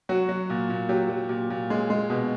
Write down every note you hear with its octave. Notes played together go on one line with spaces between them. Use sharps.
F#3 F#4
F#3
A#2
A#2
F#3 G4
F#3
A#2
A#2
G#3
G#3
B2